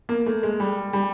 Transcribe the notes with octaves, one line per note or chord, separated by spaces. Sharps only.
A#3
A3
G#3
G3
G3